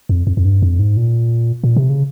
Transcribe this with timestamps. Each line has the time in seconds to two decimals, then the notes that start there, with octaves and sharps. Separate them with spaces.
0.09 F2
0.27 F2
0.37 F2
0.45 G2
0.62 F2
0.79 G#2
0.97 A#2
1.64 A#2
1.76 C3
1.89 C#3